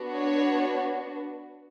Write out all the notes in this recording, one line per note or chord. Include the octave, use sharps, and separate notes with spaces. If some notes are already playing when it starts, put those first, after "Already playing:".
Already playing: B3 D4 F#4
C#5